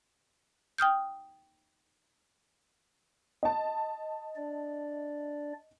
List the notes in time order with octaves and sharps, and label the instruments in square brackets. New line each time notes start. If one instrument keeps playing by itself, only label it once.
[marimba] G5 D#6 F6 G6
[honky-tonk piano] D#5 A5
[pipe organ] D4 D5